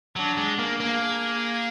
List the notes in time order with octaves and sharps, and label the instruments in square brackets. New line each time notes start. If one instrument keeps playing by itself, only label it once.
[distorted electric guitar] F#3 [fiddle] D4
[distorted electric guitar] G#3
A#3
[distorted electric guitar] A#3 [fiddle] G#4